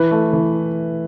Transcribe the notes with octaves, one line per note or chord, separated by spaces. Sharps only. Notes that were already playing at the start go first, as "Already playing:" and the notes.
Already playing: E3 B4
A3
E3